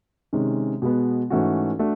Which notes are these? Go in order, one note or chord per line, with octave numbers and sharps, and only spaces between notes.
C3 D#3 G#3 C#4
B2 G#3 B3
G#2 E3 A3 C#4 F#4
A3 D4 F#4